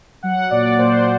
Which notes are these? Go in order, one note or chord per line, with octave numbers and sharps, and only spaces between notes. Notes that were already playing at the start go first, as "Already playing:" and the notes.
F#3 F#5
A#2 D5
A#2 C5